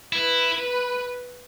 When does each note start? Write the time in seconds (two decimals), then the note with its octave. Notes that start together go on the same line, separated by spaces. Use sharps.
0.13 E4 B4
0.54 B4